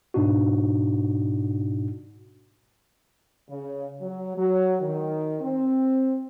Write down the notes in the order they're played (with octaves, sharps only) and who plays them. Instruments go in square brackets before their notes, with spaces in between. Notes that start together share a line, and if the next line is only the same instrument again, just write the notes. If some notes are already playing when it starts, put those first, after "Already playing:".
[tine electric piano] G#2 B2 D4 D#4 F#4
[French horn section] C#3
F#3
F#3
D#3
C4